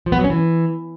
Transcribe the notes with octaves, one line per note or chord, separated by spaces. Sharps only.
F3
B3
F#3
C#4
E3